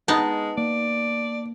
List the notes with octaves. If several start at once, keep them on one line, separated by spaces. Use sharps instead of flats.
G#3 B3 D#4 A5
A#3 D5